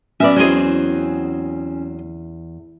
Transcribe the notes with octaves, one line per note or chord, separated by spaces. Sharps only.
F#3 B3 C#4 D5 E5
E2 F#3 C4 G#4